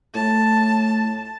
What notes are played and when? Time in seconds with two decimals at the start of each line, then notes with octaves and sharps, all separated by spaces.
0.15 A2 A5